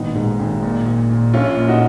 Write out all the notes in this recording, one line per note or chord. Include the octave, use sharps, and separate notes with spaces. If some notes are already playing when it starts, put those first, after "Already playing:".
Already playing: G#1 A#2 B3 D#4
G#2
G#1
A#2
A#2
A#2
A#1 C#4 F4
A#2
D#4 F#4